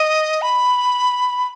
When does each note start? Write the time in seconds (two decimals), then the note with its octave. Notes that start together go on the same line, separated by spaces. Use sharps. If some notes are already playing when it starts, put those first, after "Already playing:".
Already playing: D#5
0.42 B5